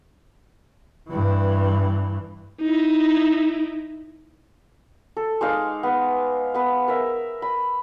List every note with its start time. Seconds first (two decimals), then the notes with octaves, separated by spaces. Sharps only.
1.09 G2 E3
2.62 D#4 E4
5.17 A4
5.41 G#3 D#4 F5 D6
5.83 B3
6.54 B3 B4
6.88 A#4 E5
7.42 B5